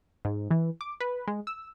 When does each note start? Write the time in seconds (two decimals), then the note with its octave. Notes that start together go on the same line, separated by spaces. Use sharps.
0.25 G#2
0.51 E3
0.81 D6
1.00 B4
1.28 G#3
1.47 E6